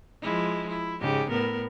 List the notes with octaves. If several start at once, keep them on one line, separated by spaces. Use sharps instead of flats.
F3 G#3 E4
E4
G#2 C#3 G4
A2 B3 A#4